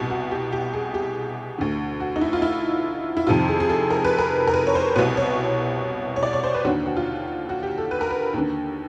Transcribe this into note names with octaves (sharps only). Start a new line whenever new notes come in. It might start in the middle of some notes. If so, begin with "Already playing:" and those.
Already playing: C2 B2
F#4
G4
G4
G#4
G4
D2 D3
F#4
D#4
E4
F4
E4
E4
F2 C3 D#3 F4
G#4
G#4
A4
A#4
B4
A#4
A#4
B4
C#5
C5
C2 B2 B4
C#5
C#5
D5
C#5
C5
B4
D#2 D3 F#4
F#4
F4
F#4
G4
A4
B4
A#4
B4
D#2 D3